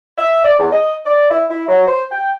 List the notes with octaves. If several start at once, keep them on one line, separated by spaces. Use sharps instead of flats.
E5
D5
E2
D#5
D5
E4
E4
F#3
C5
G5